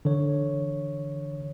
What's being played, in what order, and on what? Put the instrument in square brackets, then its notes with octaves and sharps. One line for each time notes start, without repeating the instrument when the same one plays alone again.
[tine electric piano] D3 E3 C#5